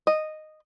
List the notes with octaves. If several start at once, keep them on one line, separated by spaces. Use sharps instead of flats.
D#5